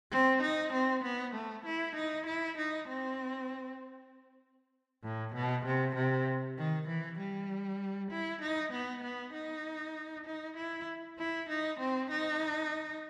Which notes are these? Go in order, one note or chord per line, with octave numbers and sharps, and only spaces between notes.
C4
D#4
C4
B3
A3
E4
D#4
E4
D#4
C4
A2
B2
C3
C3
D#3
E3
G3
E4
D#4
B3
B3
D#4
D#4
E4
E4
D#4
C4
D#4